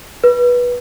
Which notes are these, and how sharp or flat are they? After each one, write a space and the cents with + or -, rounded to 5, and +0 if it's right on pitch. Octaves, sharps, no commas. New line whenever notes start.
B4 -20